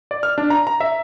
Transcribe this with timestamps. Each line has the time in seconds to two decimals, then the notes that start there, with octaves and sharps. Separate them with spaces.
0.11 D5
0.23 F6
0.38 D4
0.50 A#5
0.67 A#5
0.80 E5